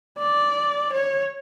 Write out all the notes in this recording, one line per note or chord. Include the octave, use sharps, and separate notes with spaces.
D5
C#5